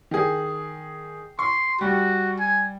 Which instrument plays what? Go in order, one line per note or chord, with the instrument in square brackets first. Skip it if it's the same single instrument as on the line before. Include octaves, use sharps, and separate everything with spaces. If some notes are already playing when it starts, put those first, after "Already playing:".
[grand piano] D#3 G#4
[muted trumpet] C6 [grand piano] C#6
[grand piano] G3 [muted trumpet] F#4
[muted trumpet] G#5